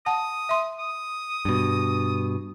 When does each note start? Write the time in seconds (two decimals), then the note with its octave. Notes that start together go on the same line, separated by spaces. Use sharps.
0.06 F#5 A5 D#6
0.49 E5 C6
0.79 D#6
1.45 G2 B2